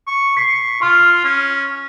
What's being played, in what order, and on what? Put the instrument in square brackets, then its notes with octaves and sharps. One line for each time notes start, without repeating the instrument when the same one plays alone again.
[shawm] C#6
[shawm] C#6 [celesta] B6 C7
[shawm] F4 [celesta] C6 F6
[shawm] C#4